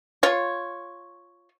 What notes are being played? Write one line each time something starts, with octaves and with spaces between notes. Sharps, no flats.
F4 C#5